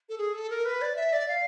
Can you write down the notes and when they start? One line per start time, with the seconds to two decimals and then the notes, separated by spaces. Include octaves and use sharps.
0.09 A4
0.18 G#4
0.33 A4
0.50 A#4
0.65 B4
0.81 D5
0.96 E5
1.13 D5
1.28 F5